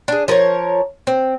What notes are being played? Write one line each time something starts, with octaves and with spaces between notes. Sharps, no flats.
D4 G#4
F3 A#4 B4 C#5
C4